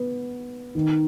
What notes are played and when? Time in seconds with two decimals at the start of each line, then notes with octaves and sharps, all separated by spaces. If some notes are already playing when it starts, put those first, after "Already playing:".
Already playing: B3
0.75 D#3